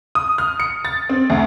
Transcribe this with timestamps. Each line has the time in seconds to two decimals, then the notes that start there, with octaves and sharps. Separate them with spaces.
0.15 D#6
0.38 F6
0.60 C#7
0.85 A6
1.09 C4
1.30 D2